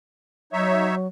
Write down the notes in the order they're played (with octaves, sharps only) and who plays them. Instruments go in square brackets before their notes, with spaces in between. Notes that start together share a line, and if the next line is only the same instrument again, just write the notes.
[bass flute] F#3 [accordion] D#4 C#5 E5